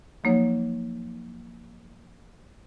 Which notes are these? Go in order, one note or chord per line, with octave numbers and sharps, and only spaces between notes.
F3 F#3 A#3 D#4 C#5